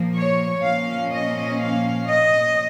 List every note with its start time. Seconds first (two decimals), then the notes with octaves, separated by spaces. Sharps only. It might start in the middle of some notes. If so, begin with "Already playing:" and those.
Already playing: A#2 F3 A#3
0.16 C#5
0.64 A#2 F3 A#3 C#4 F5
1.12 D#5
1.59 F5
2.07 D#5